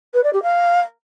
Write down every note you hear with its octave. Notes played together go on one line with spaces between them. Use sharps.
B4
D5
G4
F5